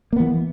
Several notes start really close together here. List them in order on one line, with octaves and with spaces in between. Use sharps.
A#3 B3 E3